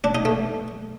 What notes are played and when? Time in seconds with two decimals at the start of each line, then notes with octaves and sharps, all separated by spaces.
0.04 D4
0.15 D#4
0.25 A3